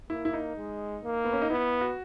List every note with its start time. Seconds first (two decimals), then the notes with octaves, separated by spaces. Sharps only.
0.10 A#3 E4
0.25 E4
0.33 D#4
0.56 G#3
1.04 A#3
1.25 B3
1.33 C#4
1.42 D#4
1.50 B3 E4
1.81 F#4